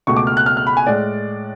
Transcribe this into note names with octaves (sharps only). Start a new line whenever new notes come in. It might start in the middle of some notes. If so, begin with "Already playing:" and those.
C#2 B2 A3 C#6
D6
F6
F#6
F6
F6
B5
G#5
A2 G#3 D5